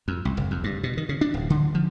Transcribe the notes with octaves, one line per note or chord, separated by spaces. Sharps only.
F2
C2
F#1
F2
G2
B2
D#3
C#3
D4
D1
D3
F3